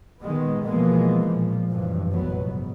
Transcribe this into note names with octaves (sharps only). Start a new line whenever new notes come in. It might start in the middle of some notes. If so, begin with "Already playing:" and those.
A#2 D#3 G#3 B3
B2 E3 F3 G#3 A#3 B3
A#2 F3
F#1 G2 E3 F3
F1 A#1 F#3 B3
G#2